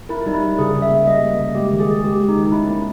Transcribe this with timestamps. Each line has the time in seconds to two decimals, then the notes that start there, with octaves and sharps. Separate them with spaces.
0.09 E4 A#4
0.26 G3 D#4
0.34 E4
0.43 G3
0.59 C#3 G#4
0.75 C#3
0.82 E5
0.91 A#3
1.07 G3 D#5
1.24 A#3
1.39 C#3
1.55 G#3 G4
1.72 D#3
1.80 G#4
1.88 D#3
2.04 G#3 G4
2.20 G#3
2.28 D#4
2.37 D#3
2.46 D#4
2.52 C#4 E4
2.68 A#3 E4